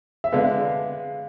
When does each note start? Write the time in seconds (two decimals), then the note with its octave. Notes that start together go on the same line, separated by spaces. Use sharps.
0.24 E5
0.32 D3 G#3 B3 F5